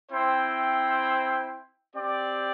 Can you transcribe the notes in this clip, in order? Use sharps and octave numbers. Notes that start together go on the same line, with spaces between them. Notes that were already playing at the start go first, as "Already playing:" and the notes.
C4 E4 C5 G5
C4 G4 D5